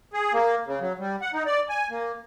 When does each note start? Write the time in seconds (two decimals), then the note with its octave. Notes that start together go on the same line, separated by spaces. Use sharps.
0.13 G#4
0.33 A#3
0.67 C#3
0.80 F#3
0.99 G3
1.22 F#5
1.34 D#4
1.46 D5
1.69 G#5
1.90 A#3